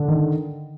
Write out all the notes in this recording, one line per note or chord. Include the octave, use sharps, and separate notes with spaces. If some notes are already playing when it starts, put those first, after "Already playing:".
Already playing: D3
D#3